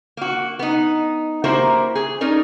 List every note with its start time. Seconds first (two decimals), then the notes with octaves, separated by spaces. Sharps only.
0.17 A#3 F#4
0.59 B3 D#4
1.44 A#3 E4 F#4 G4 A#4 C5
1.95 G#4
2.21 C#4 D#4 A#4 D5